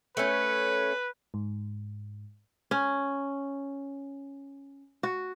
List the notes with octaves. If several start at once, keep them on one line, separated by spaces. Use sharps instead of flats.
A3 C#4 B4
G#2
C#4
F#4